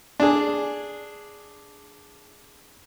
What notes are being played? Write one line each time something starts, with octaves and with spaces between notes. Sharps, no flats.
D4 G#4